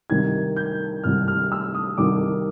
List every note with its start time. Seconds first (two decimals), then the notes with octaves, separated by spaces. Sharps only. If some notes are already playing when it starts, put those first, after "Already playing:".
0.10 C2 C3 D#3 G#6
0.56 G6
1.03 C2 C3 D#3 F6
1.28 F6
1.52 E6
1.74 D#6
1.98 C2 C3 D#3 D6